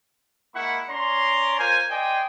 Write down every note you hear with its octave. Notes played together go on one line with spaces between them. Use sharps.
G#3 A#3 E4 F#5 B5 C#6
C#4 C#5 D5 A#5 C6
F4 A#4 C5 G#5
C5 D5 D#5 G5 G#5